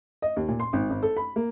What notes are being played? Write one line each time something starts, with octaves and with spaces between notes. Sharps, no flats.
D#5
D#2
A#2
C6
G#1
G#1
A4
B5
A#3